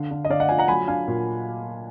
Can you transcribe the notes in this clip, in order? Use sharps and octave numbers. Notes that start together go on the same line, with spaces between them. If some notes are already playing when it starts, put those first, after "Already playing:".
Already playing: D3 F5
D3
D#5
D3 D5 F5
D#5 F#5
F3 F5 G#5
F#5 A#5
F#3 G#5 B5
D4 F5 G#5
A#2